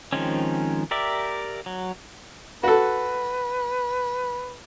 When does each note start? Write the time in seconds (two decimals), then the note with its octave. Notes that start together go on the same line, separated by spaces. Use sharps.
0.13 D#3 F3 G#3 C4 C#4
0.91 G4 A#4 D5 E5
1.66 F#3
2.63 F#4 A4 B4